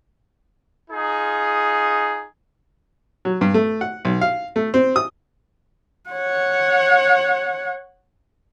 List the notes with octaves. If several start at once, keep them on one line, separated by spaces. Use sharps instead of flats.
D#4 F4 G#4
F#3
G2
A3
F#5
B1
F5
A3
C4
D#6
C#5 F#5